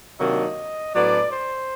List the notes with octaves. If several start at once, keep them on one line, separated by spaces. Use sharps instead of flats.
C3 D#3 F#3 A#3 D4 D#5
A2 F#3 B3 D4 D5
C5